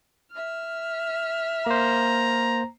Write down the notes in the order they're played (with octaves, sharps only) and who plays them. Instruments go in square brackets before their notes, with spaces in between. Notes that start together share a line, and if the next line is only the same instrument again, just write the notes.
[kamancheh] E5 F6
[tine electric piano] A#3 C5 [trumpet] A#5